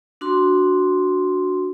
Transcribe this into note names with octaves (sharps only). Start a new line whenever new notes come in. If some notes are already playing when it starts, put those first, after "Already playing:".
D4 F#4 C6